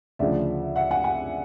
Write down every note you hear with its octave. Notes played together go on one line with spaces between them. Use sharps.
D2 C#3 F3 D5 E5
E5 F#5
F#5 G#5
F#5 G#5